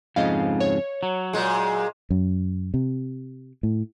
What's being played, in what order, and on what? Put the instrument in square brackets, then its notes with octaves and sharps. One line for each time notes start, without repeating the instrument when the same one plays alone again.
[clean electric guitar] F2 G#2 C#3 [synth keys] D#5 F5
[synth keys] C#5
[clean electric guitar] F#3
[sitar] A#2 G#3
[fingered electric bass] F#2
C3
A2